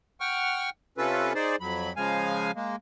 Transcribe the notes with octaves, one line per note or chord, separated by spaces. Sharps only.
F#5 G5 C#6 F6
C3 C#4 F4 A4 B4
D#4 G#4 C5 D5
F2 F#3 B5
C#3 F3 G#3 F5 G#5
G#3 A#3